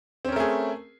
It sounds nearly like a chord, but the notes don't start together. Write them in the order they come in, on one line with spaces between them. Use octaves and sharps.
C4 C#4 A#4 A3 G#4